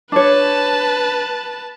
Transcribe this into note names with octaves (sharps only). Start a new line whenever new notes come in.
D4 B4 C#5 A5